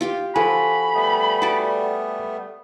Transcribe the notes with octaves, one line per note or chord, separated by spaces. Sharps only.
F4 G4 G5
F3 F#4 A4 G#5 B5
G3 A3 B3
F#4 D5